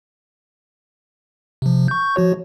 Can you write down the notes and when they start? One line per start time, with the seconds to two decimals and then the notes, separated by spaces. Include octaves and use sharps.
1.62 C3 F3
1.88 C#6 G6
2.16 F3 F#4 C#5